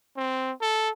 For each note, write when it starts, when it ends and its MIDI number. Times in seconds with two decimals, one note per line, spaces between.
0.17 0.52 60
0.61 0.90 69